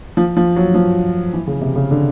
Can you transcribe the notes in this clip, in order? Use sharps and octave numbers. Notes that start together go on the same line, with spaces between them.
F3
F3
F#3
F3
E3
C#3
C3
C#3
D3